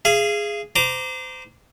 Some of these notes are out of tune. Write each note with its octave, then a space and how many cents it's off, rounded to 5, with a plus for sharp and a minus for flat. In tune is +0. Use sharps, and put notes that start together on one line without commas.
G#4 +0 F5 -40
C5 -30 A#5 +0 D6 +0